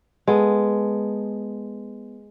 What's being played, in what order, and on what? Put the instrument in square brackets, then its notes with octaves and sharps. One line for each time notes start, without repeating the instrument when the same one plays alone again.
[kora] G#3 B3 A4